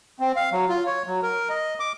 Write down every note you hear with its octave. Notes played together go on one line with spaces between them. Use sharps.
C4
F5
F#3
F4
C#5
F#3
A#4
D#5
D6